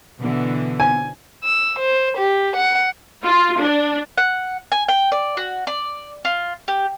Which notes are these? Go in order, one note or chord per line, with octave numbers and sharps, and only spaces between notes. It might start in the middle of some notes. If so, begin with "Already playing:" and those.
B2 D3 E3
G#5
E6
C5
G4
F#5
F4
D4
F#5
G#5
G5
D5
F#4
D5
F4
G4